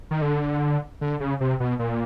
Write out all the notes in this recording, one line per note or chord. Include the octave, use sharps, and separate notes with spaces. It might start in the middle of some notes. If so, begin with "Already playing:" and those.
D#3
D3
D3
C#3
C3
B2
A#2